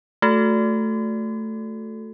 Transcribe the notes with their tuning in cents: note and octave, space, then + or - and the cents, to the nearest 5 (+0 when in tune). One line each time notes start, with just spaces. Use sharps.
A3 +0 F#4 -25 A4 +0